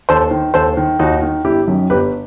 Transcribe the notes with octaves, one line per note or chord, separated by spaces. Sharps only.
D#2 A4 C5
D#3
D#2 A4 C5
D#3
D#2 D#4 F#4
D#3
G1 E4 G4
F#2 D#3
G1 G4 B4